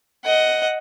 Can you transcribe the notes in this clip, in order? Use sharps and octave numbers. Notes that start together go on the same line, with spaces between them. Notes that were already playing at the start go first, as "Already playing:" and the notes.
D#5 F#5